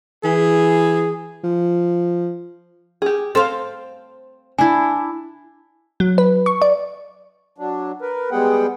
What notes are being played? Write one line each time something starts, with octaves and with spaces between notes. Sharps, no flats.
E3 G#4
F3
G4 G#4
C4 A4 C5 F5
D4 E4 G#5
F#3
B4
C#6
D5
F#3 D4
A#4 B4
G3 G#3 B3 G#4 F#5 G5